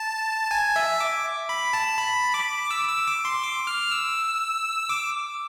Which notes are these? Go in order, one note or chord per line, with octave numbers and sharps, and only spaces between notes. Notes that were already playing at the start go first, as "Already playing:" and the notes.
Already playing: A5
G#5
E5
D6
B5
A5
B5
D6
E6
E6
D6
C6
D6
F6
E6
D6